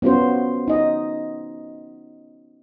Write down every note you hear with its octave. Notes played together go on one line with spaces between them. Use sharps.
B3 C#4 F4 F#4 C5
D#4 D#5